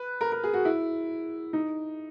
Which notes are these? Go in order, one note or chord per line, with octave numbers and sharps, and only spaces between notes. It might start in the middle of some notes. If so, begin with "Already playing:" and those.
Already playing: B4
A#4
A#4
G#4
F#4
E4
D#4